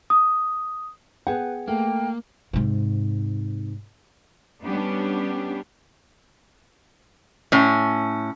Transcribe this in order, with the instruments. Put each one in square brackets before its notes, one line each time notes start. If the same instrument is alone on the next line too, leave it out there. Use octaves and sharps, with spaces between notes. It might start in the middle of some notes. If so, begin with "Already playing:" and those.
[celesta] D#6
[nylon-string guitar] B3 G#4 F#5 [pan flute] B4 [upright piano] G5
[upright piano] A3 [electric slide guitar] A#3 [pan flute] G5
[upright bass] G#2 C3
[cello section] G3 B3 C#4 D4 G4
[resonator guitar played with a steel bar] A2 C#4